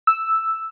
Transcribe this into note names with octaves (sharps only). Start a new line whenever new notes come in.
E6